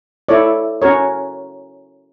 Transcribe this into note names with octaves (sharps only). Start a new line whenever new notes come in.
E4 A4 C#5 D5
C#4 F#4 A#4 C#5